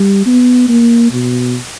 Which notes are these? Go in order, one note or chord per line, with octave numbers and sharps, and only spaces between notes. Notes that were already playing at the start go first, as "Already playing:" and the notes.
Already playing: G3
B3
A#3
B2